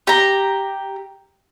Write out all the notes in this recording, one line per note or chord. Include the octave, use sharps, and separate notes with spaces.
G4 A#5